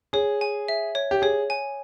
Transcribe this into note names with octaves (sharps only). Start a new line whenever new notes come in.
G#4 C#5
G#5
E5
C#5
G4
G#4 C#5
G#5